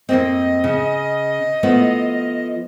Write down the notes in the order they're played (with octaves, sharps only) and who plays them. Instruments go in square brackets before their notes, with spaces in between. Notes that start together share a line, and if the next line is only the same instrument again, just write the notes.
[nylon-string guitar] F2 A#3 C4 [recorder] D#5
[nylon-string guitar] C#3
F3 A3 B3